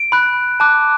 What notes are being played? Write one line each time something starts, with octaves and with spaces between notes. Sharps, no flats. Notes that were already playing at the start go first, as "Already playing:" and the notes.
Already playing: D7
B5 F#6
A5 D6 F#6